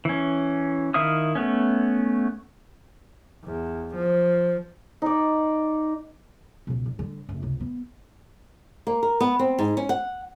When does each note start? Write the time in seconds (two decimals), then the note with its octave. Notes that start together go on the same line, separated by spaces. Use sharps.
0.05 E3 C#4
0.94 D#3 E4 E5 F5 D#6
1.35 A3 B3 C#4
3.45 E2
3.95 F3
5.02 D#4 D5
6.67 C#2 B2
6.86 A1
6.99 D3 G3
7.29 F#1 F2
7.42 C#2 C3
7.60 B3
8.87 A#3
9.03 A#4
9.20 B3
9.39 C4
9.59 G#2
9.77 C#4
9.89 F#5